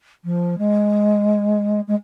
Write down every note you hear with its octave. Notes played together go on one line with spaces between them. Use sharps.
F3
G#3
G#3